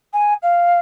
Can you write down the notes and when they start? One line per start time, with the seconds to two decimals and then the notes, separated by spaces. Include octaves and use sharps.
0.13 G#5
0.43 F5